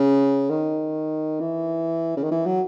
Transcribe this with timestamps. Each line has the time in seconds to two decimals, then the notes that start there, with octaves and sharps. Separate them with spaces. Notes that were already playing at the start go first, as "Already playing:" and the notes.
Already playing: C#3
0.50 D#3
1.40 E3
2.17 C#3
2.23 D#3
2.31 E3
2.46 F#3